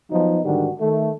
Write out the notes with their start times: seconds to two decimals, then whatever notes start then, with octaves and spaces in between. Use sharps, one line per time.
0.10 F3 F#3 B3 D#4
0.44 G#2 D3 D#3 G3 D4 F#4
0.80 D#3 A3